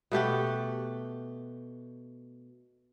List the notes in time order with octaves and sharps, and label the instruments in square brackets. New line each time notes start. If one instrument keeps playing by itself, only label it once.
[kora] B2 A3 G4 F#5